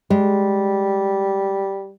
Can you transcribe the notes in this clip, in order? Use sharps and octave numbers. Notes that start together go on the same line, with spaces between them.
G3 G#3